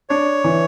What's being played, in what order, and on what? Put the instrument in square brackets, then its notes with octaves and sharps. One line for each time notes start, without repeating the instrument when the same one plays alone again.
[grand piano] D4 [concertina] C#5
[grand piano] E3